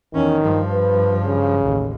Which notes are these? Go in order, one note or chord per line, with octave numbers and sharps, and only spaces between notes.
E2 D#3 C#4
G2 F3
B4
C#3
A1 D#2